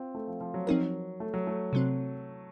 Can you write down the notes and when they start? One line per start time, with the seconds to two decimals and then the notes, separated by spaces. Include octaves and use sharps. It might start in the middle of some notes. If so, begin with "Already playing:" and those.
Already playing: C4 F4
0.15 A3
0.27 F3
0.41 F3
0.54 F#3
0.67 F3 C4 D#4 A#4
1.20 A3
1.34 F#3
1.47 A3
1.73 C3 F#3 C4